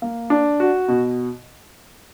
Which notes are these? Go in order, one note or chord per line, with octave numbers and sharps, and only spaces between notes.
A#3
D4
F#4
B2